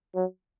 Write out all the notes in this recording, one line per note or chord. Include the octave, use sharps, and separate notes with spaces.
F#3